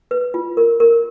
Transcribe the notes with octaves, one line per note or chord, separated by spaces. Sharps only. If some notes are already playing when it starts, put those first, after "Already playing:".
B4
F4
A#4
A#4